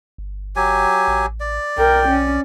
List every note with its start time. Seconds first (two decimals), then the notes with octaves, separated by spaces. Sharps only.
0.18 G1
0.56 F#3 G4 G#5
1.08 A1
1.40 D5
1.78 B1 A#4 G5
2.08 C#4